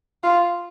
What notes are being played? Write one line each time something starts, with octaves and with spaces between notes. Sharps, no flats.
F4